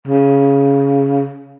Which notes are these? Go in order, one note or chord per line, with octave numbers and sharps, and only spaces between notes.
C#3